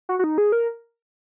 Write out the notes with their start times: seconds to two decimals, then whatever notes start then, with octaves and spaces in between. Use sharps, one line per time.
0.09 F#4
0.19 F#4
0.24 D#4
0.38 G#4
0.52 A#4